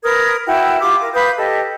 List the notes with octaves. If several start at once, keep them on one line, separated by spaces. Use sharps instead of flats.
A#4 B4 D#6 G#6
E4 F#4 G5
F4 G4 D6
A#4
B4 F5 D#6 G6
G4 A4 D#5